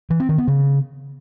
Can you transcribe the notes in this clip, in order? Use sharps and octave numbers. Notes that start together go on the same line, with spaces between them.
E3
C4
D#3
B3
C#3